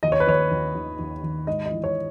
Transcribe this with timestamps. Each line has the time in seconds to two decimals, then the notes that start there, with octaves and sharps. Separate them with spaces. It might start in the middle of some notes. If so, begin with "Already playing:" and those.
0.03 D#2 D#5
0.12 C#5
0.20 B4
0.27 D#2 C#5
0.51 D#2
0.75 D#3
0.99 D#2
1.23 D#3
1.47 G#2 D#5
1.66 D#5
1.72 E3
1.84 C#5